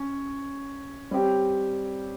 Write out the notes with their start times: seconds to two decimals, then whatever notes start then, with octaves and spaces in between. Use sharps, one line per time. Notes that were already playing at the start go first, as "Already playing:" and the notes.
Already playing: C#4
1.11 G3 C4 G4 C#5